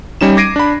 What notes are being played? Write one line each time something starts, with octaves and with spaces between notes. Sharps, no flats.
G3 C#4 D#4 E7
D6 G#6 A#6 C7 D7 D#7
D4 B5